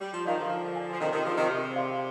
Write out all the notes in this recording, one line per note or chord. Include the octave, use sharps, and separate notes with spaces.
G3 G4
F3
D#3 D5 F5 A#5
D3 F3
A#4
D5 G#5
F3
C3 D#3 F4
C3 D#3
D3 F3 G#4 C5
C3 D#3
C3 G4
D5 F5 C6